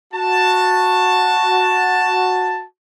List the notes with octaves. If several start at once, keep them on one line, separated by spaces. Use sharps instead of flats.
F#4 A5